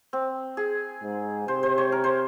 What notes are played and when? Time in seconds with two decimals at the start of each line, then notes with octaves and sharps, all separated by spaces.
0.13 C4
0.57 G#4
1.03 G#2
1.47 C3 C5
1.63 C5
1.78 C#5
1.92 A#4
2.04 C5